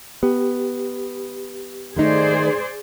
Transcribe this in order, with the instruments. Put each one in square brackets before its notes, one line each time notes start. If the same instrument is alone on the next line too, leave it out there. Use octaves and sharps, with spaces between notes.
[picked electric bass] B3 [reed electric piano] G4
[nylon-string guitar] D#3 A3 D#4 [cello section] G#4 C5 D5